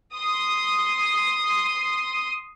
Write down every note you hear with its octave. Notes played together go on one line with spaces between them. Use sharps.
C6 D#6